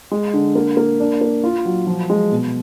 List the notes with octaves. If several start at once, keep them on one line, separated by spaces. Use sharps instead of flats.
G#3
D3
A#3
A#3
D4
A#3
F4
F#3
F3
G#3
B2